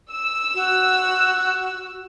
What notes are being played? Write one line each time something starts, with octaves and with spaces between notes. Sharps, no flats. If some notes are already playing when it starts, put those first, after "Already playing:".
E6
F#4